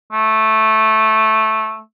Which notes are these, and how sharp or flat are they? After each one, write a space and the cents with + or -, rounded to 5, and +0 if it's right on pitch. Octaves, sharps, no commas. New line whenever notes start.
A3 -5